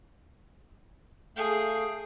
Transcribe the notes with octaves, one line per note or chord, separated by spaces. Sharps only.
A3 G#4 F5 G5